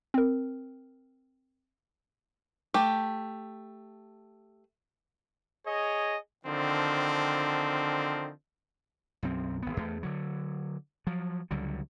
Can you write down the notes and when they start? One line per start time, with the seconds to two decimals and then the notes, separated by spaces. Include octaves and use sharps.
0.14 C4 A#4
2.74 A3 G4
5.65 G#4 C#5 D#5
6.46 D3 D#3 F3 C4
9.23 B1 F#2 C4
9.62 G#1 B3
9.77 E2 A3
10.03 D3 F#3
11.07 F3 F#3
11.51 C#2 D3 F#3 G3